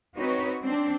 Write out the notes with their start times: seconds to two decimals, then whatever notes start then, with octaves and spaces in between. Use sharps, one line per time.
0.16 C4 D#4 F#4 B4 C#5
0.62 C4 D4